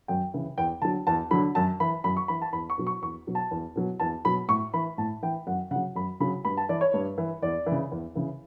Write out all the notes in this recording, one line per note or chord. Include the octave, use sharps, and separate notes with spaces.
F#2 G5
C#3 E3
E2 G5
D3 F#3 A5
E2 A5
D3 F#3 B5
F#2 A5
E3 B5
F#2 B5
C#6
E3 B5
A5
E2 B5
C#6
B2 F#3
C#6
E2 C#6
B2 F#3
A5
E2
B2 F#3
E2 A5
B2 F#3 B5
A2 C#6
E3 B5
A2 A5
E3 G5
F#2 F#5
C#3 F#5
F#3
F#2 B5
C#3 F#3 B5
G2 B5
A5
E3 D5
C#5
G2
E3
E2 D5
E3
C#3
E2
C#3 E3